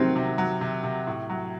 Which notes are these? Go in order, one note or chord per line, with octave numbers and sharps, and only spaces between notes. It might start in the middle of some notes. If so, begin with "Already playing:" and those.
Already playing: C3 D#3 F#3 C4
C3
F#3
C3
C3
A2
F#3